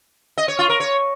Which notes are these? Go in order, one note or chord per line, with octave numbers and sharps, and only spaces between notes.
D#5
C#5
F4
A#4
C#5